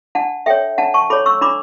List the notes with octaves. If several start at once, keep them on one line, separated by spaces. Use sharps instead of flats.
D4 F#5 A5
A4 C#5 E5 G5
D4 F#5 A5
A5 C#6
A4 C#5 B5 D6
C#6 E6
D4 B5 D6